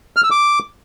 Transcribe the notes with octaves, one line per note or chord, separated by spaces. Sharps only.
F6
E6
D6